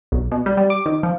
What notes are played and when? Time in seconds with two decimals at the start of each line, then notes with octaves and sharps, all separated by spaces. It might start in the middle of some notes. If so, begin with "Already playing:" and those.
0.12 B1
0.31 B2
0.46 G3
0.57 G3
0.70 D6
0.86 D#3
1.03 F3